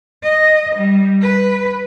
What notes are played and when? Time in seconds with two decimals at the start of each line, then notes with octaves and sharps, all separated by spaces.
0.23 D#5
0.75 G3
1.22 B4